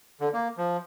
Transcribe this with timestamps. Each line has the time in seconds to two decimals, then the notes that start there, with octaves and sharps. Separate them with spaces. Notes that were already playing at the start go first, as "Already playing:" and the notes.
0.20 D3
0.33 A#3
0.57 F3